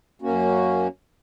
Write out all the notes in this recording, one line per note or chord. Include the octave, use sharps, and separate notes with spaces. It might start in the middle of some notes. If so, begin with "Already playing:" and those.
F#2 A#3 C#4 F#4